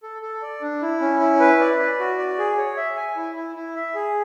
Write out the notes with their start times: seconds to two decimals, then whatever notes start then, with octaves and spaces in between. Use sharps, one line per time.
0.03 A4
0.22 A4
0.42 D5
0.62 D4
0.82 E4
1.00 C#4
1.20 E4
1.40 B4
1.60 D5
1.79 D5
2.00 F#4
2.19 D5
2.38 G#4
2.58 C#5
2.77 E5
2.97 G#5
3.16 E4
3.36 E4
3.56 E4
3.75 E5
3.95 G#4